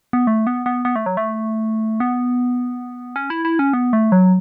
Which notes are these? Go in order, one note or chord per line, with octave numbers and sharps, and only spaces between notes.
B3
A3
B3
B3
B3
A3
F#3
A3
B3
C#4
E4
E4
C#4
B3
A3
F#3